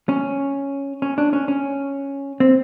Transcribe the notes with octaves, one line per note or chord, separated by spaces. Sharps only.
C#4
C#4
D4
C#4
C#4
C4